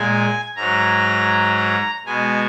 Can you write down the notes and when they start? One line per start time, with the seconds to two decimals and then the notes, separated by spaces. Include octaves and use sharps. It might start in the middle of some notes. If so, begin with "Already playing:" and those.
Already playing: A#2 G#3 G#5
0.56 G#2 F#3 A#5
2.05 B2 G#3 G#5